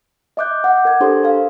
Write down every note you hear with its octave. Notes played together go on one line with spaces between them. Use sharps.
D#5 E5 D6 F#6 G6
F#5 D6
A#4 G#6
D4 G4 A4 C5 C6
A#4 F5